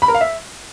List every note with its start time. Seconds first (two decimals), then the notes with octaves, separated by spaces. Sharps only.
0.02 B5
0.08 A#4
0.15 F5
0.21 E5